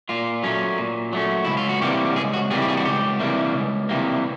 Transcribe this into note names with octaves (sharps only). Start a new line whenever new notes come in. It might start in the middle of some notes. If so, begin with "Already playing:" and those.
A#2 F4
F#3 A3 C#4
A#2
F#3 A3 C#4
C#2 E4
F4
F#4
C3 E3 G3 A#3 G4
C#2 G#4
F#4
C3 E3 G3 A#3 G#4
G4
G#4
F#4
C#2 G4
C3 E3 G3 A#3
C#2
C3 E3 G3 A#3